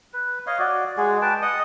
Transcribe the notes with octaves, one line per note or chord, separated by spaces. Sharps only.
B4
C#5 D#5 F5
F#4 D5
G#3 F#4 G#4
B4 G5 A5
D#5 F#5 D#6